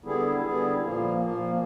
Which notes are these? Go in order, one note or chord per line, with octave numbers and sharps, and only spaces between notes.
D3 G3 B3 E4 G#4
D3 G3 B3 E4 G#4
A#2 F3 A#3
A#2 F3 A#3